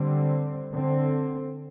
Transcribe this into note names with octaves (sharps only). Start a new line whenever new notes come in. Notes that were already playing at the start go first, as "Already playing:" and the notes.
Already playing: D3 G3 C4
D3 C4